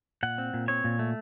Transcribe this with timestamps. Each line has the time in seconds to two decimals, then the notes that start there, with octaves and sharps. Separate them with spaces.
0.23 A#2 F#5
0.38 C4
0.54 A#2
0.68 C4 C#5
0.84 A#2
0.99 A3